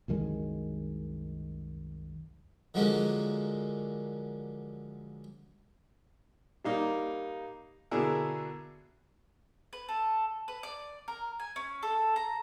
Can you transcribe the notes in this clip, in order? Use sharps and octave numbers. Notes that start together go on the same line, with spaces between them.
C2 F#2 D#3 G#3
D3 F3 F#3 G#3 A#3 C#4
G3 A#3 D#4
B2 D3 E4 G#4 A#4
B4
A4
B4
D5
A#4
G#5
C#4
A4
A#5